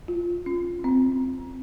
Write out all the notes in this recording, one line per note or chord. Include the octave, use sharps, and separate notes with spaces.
F4
C#4
C4